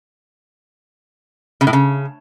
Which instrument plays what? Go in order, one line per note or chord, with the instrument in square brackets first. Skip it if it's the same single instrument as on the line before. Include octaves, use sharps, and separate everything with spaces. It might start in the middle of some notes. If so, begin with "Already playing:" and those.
[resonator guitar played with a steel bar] C#3
A2
C#3